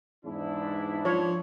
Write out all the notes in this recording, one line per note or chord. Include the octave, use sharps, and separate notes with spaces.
E2 G#2 D4 E4
F3 C#5